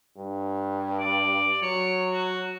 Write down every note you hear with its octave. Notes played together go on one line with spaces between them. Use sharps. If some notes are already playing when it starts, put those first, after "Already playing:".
G2
D5
F#3 C#5
F#4